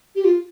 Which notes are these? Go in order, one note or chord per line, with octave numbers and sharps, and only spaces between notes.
G4
F4